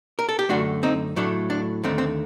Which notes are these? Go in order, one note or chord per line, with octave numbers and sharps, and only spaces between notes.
A#4
A4
G4
F#2 D3 A3 D4 F#4
C4 D#4
A2 F#3 A3 D4
D4
D#2 D3 A3 C4
C4